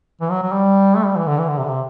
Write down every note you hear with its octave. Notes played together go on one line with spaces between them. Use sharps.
E3
F#3
F#3
G3
A3
G3
E3
D3
E3
D3
C3
D3
C3